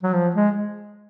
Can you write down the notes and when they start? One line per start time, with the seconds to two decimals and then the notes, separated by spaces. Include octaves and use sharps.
0.03 F#3
0.13 F3
0.34 G#3